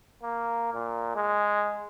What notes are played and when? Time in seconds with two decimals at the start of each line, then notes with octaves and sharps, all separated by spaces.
0.23 A#3
0.74 A#2
1.15 G#3